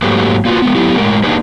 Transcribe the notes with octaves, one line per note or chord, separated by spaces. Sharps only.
G#2 F#3 A3 A#3 G4 B4
A#3 F4 F#4 B4
G#3 B3
F#3 A3 B3 E4 G4
A2 G#3 A#4
A#3 D4 D#4 G4 G#4 B4